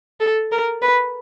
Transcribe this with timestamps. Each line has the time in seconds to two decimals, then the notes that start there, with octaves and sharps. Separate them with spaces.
0.20 A4
0.52 A#4
0.82 B4